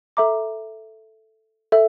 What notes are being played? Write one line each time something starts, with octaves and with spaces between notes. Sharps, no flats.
A4 E5 A#5 D6
A4 E5